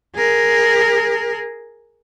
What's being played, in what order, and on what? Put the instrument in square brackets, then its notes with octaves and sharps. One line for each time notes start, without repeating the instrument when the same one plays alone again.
[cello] G#4 A#4